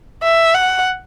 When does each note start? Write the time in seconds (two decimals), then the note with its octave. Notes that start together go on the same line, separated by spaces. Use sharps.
0.23 E5
0.55 F#5